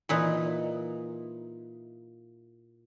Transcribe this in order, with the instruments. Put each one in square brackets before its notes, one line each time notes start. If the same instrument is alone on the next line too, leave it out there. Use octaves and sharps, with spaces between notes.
[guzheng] A#2 E3 D#4